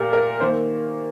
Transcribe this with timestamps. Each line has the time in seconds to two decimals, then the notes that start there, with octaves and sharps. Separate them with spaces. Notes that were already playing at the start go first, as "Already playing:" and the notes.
Already playing: A#2 G4 A#4
0.13 A#4
0.40 D#3 A#3 C5